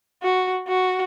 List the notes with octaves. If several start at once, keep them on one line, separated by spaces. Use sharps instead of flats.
F#4
F#4